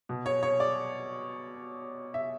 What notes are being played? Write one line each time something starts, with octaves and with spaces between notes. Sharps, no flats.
B2
C#5
C#5
D5
E5